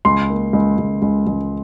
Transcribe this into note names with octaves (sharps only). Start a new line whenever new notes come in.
C#2 C6
A#3
C#2
C#2
C#2
C#2